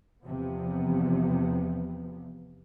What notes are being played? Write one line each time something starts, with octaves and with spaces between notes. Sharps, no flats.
E2 C3 F3 B3